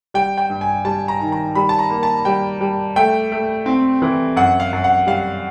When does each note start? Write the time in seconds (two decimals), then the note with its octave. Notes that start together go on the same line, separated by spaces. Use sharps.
0.14 G3 G5
0.38 G5
0.50 G2
0.61 G#5
0.85 G3 A5
1.08 A#5
1.20 D#3
1.32 A#5
1.55 G3 B5
1.69 A5
1.79 A#5
1.90 A#3
2.03 A5
2.25 G3 G5
2.61 G3
2.96 A3 G5
3.32 A3
3.66 C4
4.02 E3
4.36 F#2 F#5
4.60 F5
4.73 F#2
4.84 F#5
5.07 G3 F5